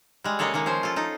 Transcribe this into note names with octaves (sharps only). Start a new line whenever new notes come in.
G3 G#3
C#3 G#3 A#3 G#4 A4 C#5
D#3 G#3 A#3 C#4
F3 C#4 C5
F4 A4
D#4 A4